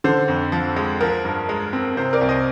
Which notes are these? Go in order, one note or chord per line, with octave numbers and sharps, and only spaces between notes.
D3 C5
F2
F3
G#3
F3 A#4
G2
G#3
C4
C3 C5
A#4 D5
C2
C5 D#5